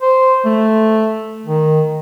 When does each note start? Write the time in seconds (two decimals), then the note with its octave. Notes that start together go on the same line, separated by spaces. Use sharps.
0.01 C5
0.45 A3
1.46 D#3